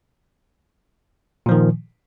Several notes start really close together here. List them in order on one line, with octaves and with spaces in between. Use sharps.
A#2 F3 D#3